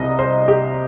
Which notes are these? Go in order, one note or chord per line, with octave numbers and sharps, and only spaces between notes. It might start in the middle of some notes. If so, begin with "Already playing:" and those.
Already playing: C2 C3 G3 D#5
C5
G4